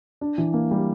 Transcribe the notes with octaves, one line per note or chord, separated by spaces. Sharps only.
D4
E3
A#3
G3